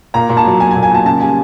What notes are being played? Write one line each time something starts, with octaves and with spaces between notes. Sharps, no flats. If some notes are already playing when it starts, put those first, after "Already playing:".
A#2 A#5
A#2
A5
F#3
F#3 G#5
G#5
A#2
G#5
A#2 A5
C#3 A5
G3 G#5